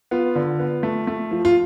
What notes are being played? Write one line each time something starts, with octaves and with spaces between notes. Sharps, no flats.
B3 F4
D3
B3
A3
A3
F3
F4